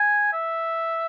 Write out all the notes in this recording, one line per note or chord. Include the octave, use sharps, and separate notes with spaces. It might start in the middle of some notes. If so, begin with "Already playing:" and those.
Already playing: G#5
E5